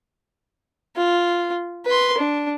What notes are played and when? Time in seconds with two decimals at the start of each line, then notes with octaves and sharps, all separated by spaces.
0.97 F4
1.86 B4 C6
2.18 D4